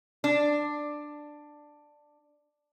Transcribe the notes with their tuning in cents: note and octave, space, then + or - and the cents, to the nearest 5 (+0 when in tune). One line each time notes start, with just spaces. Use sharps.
D4 +10